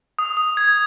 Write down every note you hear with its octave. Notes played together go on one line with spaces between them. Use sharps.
D#6
D#6
G#6